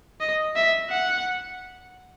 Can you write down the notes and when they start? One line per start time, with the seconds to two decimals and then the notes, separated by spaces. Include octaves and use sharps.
0.20 D#5
0.56 E5
0.90 F#5